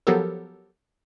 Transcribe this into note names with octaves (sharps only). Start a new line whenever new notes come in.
F3 F#3 B3 G4 A4 A#4